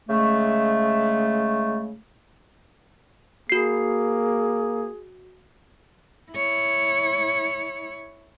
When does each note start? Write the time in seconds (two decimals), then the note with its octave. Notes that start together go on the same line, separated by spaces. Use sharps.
0.09 C#3 G#3 A3
3.50 A#3 F#4 G#4 C7
6.32 E4 C#5